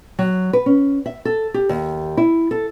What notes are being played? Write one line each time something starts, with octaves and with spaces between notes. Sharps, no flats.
F#3
B4
C#4
E5
A4
G4
D#2
E4
A4